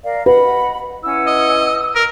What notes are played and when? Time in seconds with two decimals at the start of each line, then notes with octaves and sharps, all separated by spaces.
0.04 A#4 D5 F5
0.26 B4 D#5 F#5 B5
1.03 C#4 E4 F#5 E6
1.27 D#5
1.95 A#4